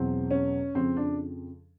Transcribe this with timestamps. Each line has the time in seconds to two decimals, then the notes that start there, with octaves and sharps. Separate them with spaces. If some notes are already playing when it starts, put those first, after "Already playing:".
Already playing: E2 B2 F#3 C4
0.31 C#4
0.75 F2 C#3 F3 C4
0.97 D4